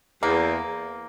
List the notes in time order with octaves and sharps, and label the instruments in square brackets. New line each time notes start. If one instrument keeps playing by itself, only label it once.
[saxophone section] E2 [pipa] A#3